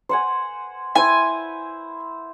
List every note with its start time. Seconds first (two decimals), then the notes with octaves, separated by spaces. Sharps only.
0.09 C5 F#5 G#5
0.96 E4 C5 G#5